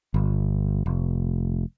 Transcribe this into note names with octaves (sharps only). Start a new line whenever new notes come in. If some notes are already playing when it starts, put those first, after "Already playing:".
G1
F1